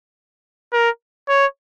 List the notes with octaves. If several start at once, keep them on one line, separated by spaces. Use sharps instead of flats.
A#4
C#5